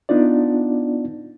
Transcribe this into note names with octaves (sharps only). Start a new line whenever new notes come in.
B3 D4 D#4 F4 D5